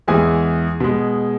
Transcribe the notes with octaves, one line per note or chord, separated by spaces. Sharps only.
E2 E3 G#3 G#4 G#5
B2 G#3